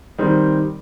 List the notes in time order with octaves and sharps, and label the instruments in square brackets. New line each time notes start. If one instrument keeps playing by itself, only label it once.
[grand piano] D#3 G3 C4